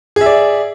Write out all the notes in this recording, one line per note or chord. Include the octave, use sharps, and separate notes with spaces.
G#4 D5 E5